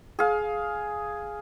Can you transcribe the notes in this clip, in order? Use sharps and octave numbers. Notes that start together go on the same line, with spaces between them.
G#4 F5